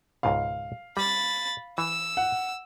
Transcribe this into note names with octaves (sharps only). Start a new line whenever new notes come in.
C#2 G#2 B2 F5
G3 B5 A6
E3 E6
F#5